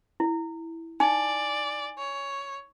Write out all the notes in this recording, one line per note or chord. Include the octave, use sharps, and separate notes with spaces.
E4
D#4 D5 G#5
C#5